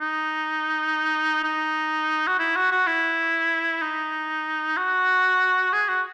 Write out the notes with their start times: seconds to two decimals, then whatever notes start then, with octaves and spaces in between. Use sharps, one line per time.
0.01 D#4
1.43 D#4
2.27 F#4
2.39 E4
2.56 F#4
2.71 F#4
2.87 E4
3.82 D#4
4.77 F#4
5.73 G#4
5.88 F#4